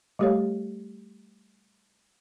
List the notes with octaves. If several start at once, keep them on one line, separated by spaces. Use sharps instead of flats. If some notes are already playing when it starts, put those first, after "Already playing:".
G3 A3 G4 A4 C#5 F5